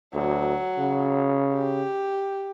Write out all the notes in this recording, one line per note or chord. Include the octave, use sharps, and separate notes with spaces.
D2 F#3
C#3
G4